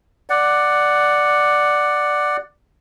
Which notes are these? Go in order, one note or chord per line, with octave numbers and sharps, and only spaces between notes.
D5 F#5